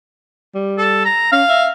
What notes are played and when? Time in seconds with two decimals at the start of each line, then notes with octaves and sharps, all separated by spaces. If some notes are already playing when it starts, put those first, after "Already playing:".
0.55 G3
0.78 A4
1.05 A#5
1.32 C#4 F5
1.49 E5